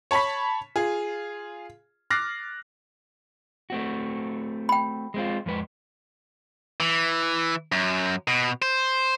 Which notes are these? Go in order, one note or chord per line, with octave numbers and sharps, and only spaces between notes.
C#5 A5 B5 C#6 B6
F4 G#4
D6 F6 F#6 A6 A#6 C7
A3 C4 F#4
G5 B5
G#3 C4 F4
F2 G#3 B4
E3
F#2
B2
C5